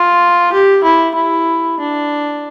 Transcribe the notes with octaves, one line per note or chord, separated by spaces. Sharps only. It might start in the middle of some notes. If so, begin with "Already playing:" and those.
Already playing: F4
G4
E4
E4
D4